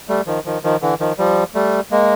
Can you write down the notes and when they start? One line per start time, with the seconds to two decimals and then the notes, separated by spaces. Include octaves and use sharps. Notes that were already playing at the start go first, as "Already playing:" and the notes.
0.09 G3 A3
0.27 D#3 F3
0.45 D#3 F3
0.63 D#3 F3
0.82 D3 E3
1.00 D#3 F3
1.18 F3 G3
1.55 G3 A3
1.91 G#3 A#3